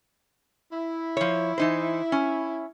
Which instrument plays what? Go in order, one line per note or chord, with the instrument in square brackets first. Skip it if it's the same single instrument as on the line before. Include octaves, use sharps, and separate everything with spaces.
[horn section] E4
[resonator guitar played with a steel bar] F3 C#5
E3 D#4 C5
C#4